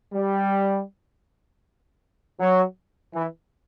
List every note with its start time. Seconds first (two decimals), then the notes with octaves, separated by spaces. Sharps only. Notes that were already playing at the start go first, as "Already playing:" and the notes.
0.13 G3
2.40 F#3
3.14 E3